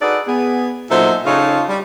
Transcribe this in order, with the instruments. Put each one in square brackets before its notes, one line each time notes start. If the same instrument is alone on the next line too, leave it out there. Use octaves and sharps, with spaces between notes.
[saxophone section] D#4 F#4 G#4 A4 B4 D5
B3 G#4
A#2 F#3 D#4 A4 C5 E5
C#3 D#4 F4 A4 C#5 F5
G3